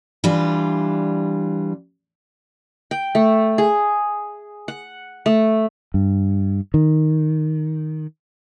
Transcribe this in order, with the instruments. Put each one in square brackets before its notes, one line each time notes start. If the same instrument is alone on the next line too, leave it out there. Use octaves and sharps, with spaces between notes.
[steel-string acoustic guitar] E3 G3 D4 F4
[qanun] G5
A3
G#4
F#5
A3
[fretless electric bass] G2
D#3